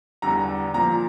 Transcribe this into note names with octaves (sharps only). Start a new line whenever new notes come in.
E2 D3 G3 A#5
A#2 F3 A#5